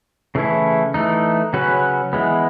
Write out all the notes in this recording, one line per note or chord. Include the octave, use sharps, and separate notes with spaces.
C#3 E3 A3 C#4 E4
E3 A3 D#4
C#3 F#3 C#4 F#4 B4
E3 G#3 B3